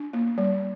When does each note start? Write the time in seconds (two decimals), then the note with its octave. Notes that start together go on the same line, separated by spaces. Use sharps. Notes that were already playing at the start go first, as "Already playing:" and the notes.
Already playing: D4
0.13 A#3
0.38 G3